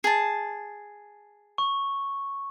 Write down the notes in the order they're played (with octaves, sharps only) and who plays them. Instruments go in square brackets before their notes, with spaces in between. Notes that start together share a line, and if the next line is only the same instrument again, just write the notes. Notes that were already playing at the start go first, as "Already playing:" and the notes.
[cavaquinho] G#4 A5
[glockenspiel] C#6